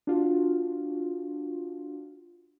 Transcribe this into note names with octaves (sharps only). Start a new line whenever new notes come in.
D4 F4 F#4